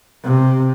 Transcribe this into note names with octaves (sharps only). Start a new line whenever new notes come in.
C3